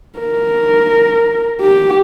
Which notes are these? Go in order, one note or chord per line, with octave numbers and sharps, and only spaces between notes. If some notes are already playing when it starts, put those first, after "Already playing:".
A#4
G4